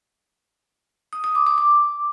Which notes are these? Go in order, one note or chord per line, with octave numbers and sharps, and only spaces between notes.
D#6
D#6
D6
D6
D6